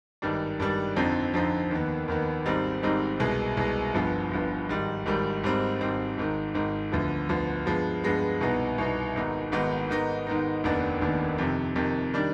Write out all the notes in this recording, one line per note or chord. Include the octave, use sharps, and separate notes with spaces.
G#1 G2 D#3 G3 D4
G#1 G2 D#3 G3 D4
F2 D3 F3 C4 D#4
F2 D3 F3 C4 D#4
D#2 D#3 B3
D#2 D#3 B3
G#1 G#2 G3 C4 D#4
G#1 G#2 G3 C4 D#4
C2 B2 G#3
C2 B2 G#3
G1 G2 F3 B3
G1 G2 F3 B3
G#1 G#2 D#3 G3
G#1 G#2 D#3 G3
G#1 G#2 G3 C4
G#1 G#2 G3 C4
G#1 G#2 D#3
G#1 G#2 D#3
D2 D3 F3 B3
D2 D3 F3 B3
G2 F3 G#3 B3
G2 F3 G#3 B3
C2 B2 B3 D#4
C2 B2 B3 D#4
G#1 G#2 D#3 B3 D#4
G#1 G#2 D#3 B3 D#4
G#2 D#3 B3 D#4
G#2 D#3 B3 D#4
F1 D#2 D#3 B3 D4
F1 D#2 D#3 B3 D4
F2 C3 D#3
F2 C3 D#3
D#3 G3 D4